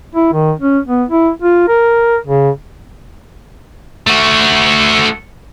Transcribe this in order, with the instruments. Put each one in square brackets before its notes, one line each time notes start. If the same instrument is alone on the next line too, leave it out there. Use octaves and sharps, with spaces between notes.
[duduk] E4
D#3
C#4
B3
E4
F4
A#4
C#3
[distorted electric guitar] A3 F#4